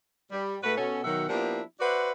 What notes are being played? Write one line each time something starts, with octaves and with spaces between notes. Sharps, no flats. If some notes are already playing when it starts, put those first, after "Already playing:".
G3
G#2 A3 F#4 B4
B2 C#4 A4
B2 D#3 F#3 E5 F#5
F3 A#3 B3 D4 E4 G4
F#4 B4 C5 D5 E5 F#5